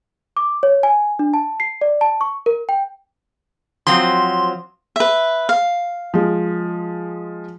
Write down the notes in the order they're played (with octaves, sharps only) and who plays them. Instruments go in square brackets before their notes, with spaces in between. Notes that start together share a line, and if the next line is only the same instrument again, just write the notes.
[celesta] D6
C#5
G#5
D4
A5
C7
D5
A5
C#6
A#4
G5
[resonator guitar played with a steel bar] F3 F#3 C4 [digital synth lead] C6
[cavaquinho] B4 E5
F5
[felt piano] F3 G#3